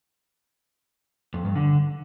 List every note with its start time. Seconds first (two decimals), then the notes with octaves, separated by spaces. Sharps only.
1.34 F2
1.45 G2
1.56 D3